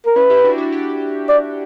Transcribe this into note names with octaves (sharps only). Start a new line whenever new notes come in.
A#4
C#4 E4 B4
E4 G4
D4 F#4
D4 F#4
E4 G4
D5